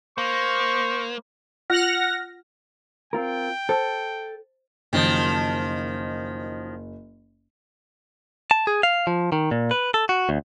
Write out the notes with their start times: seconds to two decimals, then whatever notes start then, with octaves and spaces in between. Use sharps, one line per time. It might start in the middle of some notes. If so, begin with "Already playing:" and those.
0.18 A#3 C5 C#6
1.70 F4 F#5 F6 A#6
3.13 C4 F4 A#4 G5
3.69 A4 C5 A5
4.93 F#1 D#3 F3
8.51 A5
8.67 G#4
8.83 F5
9.07 F3
9.32 D#3
9.51 A#2
9.71 B4
9.94 A4
10.09 F#4
10.29 D2